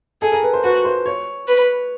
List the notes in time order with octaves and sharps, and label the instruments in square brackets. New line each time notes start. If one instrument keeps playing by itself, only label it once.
[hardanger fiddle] G#4 [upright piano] A4
[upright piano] A#4
B4
C5
[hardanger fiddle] F#4 [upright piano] B4
[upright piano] C5
C#5
[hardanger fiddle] B4